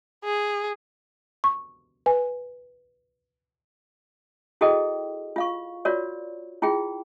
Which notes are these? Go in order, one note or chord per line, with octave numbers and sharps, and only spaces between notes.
G#4
C#6
B4 G#5
E4 F#4 G#4 A4 D#5 G5
F4 F5 C#6
F4 F#4 A#4 C#5 D5
E4 F4 G#4 G5